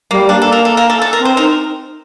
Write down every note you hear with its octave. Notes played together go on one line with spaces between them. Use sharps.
G3 A#3
A#3 D4
A4
A#4
A4
A#4
A4
A4
A#4
C4
C5
D#4 A#4